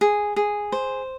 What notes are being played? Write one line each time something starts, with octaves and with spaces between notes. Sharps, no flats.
G#4
G#4
C5